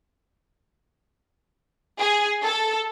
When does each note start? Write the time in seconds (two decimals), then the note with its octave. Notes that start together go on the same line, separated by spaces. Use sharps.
1.98 G#4
2.44 A4